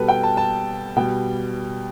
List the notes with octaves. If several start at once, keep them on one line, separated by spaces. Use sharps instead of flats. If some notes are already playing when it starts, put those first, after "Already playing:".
Already playing: B2 G3 A4 B4
G5
A5
A5
B2 G3 G5